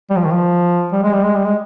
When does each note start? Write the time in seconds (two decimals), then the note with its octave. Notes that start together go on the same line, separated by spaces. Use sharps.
0.10 G3
0.16 F3
0.24 D#3
0.31 F3
0.93 G3
1.03 G#3
1.13 G3
1.23 G#3
1.35 G3
1.45 G#3